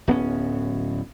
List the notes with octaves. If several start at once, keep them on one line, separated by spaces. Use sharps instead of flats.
D1 B3 C#4